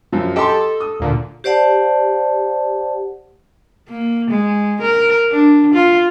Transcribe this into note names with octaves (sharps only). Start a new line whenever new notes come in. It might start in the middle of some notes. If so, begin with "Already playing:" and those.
F#2 F3
G4 A4 D#5 C6
A4
D#6
D2 A#2 D3
G4 C5 D5 F#5 A5
A#3
G#3
A#4
D4
F4